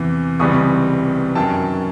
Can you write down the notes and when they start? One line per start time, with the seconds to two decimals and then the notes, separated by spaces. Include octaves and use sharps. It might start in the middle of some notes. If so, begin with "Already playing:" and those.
Already playing: E2 C3 E3
0.39 C#2 C3 E3 G3 C4 C#6 D#6
1.35 F#2 D#3 F#3 G5 A5